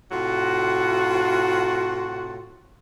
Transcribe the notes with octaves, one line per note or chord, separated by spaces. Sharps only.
A2 C3 F4 F#4